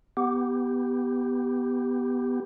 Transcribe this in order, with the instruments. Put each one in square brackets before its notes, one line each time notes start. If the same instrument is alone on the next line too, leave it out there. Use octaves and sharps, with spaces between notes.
[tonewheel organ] B3 G4